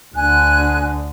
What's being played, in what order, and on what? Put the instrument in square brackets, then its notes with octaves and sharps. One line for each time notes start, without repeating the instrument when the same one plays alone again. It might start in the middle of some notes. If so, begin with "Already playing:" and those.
[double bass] D2 D3 [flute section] G#5 F#6